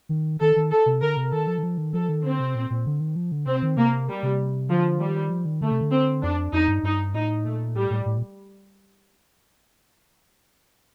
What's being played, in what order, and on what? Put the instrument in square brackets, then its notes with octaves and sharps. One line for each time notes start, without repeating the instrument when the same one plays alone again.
[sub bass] D#3
[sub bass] D#3 [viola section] A4
[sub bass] D#3
[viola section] A4
[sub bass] C3
[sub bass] D3 [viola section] A#4
[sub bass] C3
[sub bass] D#3 [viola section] A4
[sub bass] F3
D#3
F3
D#3
[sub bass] F3 [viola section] A4
[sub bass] D#3
[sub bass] D3 [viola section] C4
[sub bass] C3
A#2
A#2
D3
D#3
F3
D3
[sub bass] C3 [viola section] C4
[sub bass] D#3
[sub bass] C3 [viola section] A#3
[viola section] G3
[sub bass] C3
[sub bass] D3 [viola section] F3
[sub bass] D#3 [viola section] G3
[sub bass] F3
D#3
[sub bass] D3 [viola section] A3
[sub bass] C3
D3
[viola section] C4
[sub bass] F2 [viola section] D4
[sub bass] F2 [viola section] D#4
[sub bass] G2
[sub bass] G2 [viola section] D#4
[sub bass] A2 [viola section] D#4
[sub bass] A#2 [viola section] A3
[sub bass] A2 [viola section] G3
[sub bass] A2
A2
A#2